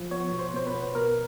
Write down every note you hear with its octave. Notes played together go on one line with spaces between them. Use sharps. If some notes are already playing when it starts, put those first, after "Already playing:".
Already playing: F3
B3 C#5
B2
C5
B2 C5
B4
B3
B2 A#4